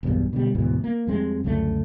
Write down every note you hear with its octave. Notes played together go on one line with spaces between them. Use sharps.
B1 E2 G2 B2
B2 D3 G3
D2 G#2 B2 E3
A#3
F2 G3 G#3 C4
C#2 F#2 D3 A3